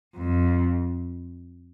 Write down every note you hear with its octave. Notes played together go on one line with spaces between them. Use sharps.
F2